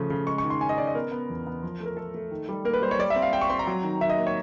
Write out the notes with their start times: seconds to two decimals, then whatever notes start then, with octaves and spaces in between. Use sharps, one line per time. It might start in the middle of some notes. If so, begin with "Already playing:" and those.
Already playing: C#3 F3 A3
0.10 C#3
0.27 G#3 C#6
0.38 C#6
0.44 D#3
0.50 C6
0.61 C#4 G#5
0.69 D#5
0.78 C#4 D5
0.87 D#5
0.95 B3 A#4
1.12 B3
1.30 E2
1.47 B3
1.63 F3
1.80 A3
1.86 A#4
1.97 A3 A4
2.14 A3
2.31 D#3
2.49 G3
2.65 A#3 A#4
2.73 B4
2.82 G3 C5
2.91 C#5
2.99 G3 D5
3.10 E5
3.16 C4
3.22 F5
3.33 C4 G5
3.41 C#6
3.49 C4 C6
3.59 A#5
3.67 F#3
3.84 D#3
4.01 D#3 E5
4.10 D#5
4.18 A#3
4.27 C#5